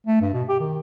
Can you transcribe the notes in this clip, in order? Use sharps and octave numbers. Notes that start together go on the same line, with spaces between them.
A3
G2
B2
G4
D#3